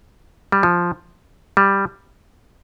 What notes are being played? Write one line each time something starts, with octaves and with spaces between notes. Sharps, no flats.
G3
F3
G3